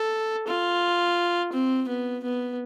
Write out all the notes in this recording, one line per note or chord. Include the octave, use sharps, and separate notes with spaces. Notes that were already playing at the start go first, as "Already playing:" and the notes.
Already playing: A4
F4
C4
B3
B3